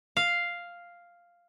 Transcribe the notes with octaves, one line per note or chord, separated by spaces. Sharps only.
F5